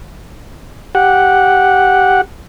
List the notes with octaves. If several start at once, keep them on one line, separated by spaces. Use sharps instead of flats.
G4 F#5